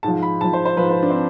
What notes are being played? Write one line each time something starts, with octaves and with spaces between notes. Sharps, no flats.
G#2 F3 A5
B5
G#2 F3 A5
C5
C5
G#2 F3 B4
B4
D4
C4